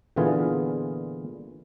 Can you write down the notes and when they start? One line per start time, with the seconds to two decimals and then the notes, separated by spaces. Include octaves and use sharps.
0.16 A#2 D3 E3 B3 F4 G#4